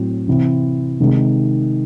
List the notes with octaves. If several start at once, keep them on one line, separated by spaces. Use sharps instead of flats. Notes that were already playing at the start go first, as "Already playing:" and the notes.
Already playing: A2 F#3 C4
C3 E3 C4 E4
C3 D#3 G#3 D#4